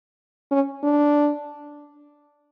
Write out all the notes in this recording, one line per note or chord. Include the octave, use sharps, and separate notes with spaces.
C#4
D4